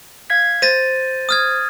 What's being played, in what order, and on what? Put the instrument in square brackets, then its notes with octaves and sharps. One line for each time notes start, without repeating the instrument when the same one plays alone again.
[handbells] F5 G#6 B6
[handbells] C5 [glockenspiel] A6 A#6 D#7
[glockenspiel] D#6 F6 G#6